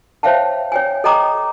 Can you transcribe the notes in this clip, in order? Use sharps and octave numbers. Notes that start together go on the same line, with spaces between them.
C5 C#5 E5 F5 G5 A5
C#5 G5 G#5
A4 D#5 G5 A#5 D6 D#6